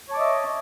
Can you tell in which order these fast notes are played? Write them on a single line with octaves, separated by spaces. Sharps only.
C#5 A5 D6 D#5 E5